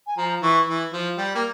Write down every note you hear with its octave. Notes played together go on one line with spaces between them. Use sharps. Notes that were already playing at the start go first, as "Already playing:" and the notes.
G#5
F3 A#5
E3 C#6
E3
F3
G3
A#3